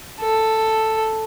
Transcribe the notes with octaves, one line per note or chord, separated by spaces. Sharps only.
A4